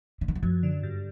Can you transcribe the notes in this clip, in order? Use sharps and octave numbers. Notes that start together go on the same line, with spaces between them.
D3
D#3
E3
F#2 F3
D3
G2